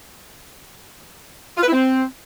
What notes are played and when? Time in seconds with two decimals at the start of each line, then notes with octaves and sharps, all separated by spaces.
1.58 F4
1.63 B4
1.68 E4
1.73 C4